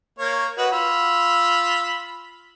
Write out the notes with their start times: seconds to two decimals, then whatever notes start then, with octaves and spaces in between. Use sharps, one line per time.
0.19 A#3 C#5
0.58 F#4 B4 D#5
0.72 F4 B5 E6